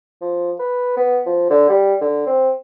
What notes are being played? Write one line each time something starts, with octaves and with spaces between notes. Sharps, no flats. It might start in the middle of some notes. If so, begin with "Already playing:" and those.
F3
B4
B3
F3
D3
G3
D3
C4